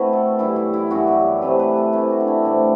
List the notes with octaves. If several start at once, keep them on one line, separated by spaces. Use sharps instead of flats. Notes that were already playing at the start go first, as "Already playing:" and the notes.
Already playing: B2 A3 C4 E4 F#4 B4
A4
F#2 E3 G3 E4
E4
E4
F#2 E3 G3 F#4
G4
C3 E3 A3 B4
B4
A4
C3 E3 A3 G4
F#4
D4
E4
A2 G3 C4